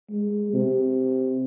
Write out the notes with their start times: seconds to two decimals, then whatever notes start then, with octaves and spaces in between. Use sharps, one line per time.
0.11 G#3
0.53 C3